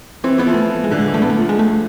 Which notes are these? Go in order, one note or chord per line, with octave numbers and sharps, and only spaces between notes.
E3 C4
E3 B3
F3
A3
G#3
D3
G#3
E3
D3 A3
B3
A3
F3
G#3
A3